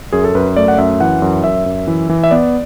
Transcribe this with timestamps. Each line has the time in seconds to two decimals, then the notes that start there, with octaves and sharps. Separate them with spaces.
0.13 F#2 G#4
0.24 A4
0.35 F#2 B4
0.56 A3 D5
0.68 F#5
0.78 F#2 E5
1.00 E3 F#5
1.22 F#2
1.44 F#2 E5
1.66 F#2
1.88 E3
2.10 E3
2.24 E5
2.31 B3 D5